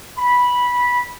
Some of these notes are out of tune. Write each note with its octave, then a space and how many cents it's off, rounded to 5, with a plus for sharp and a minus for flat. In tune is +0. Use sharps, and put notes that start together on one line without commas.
B5 -10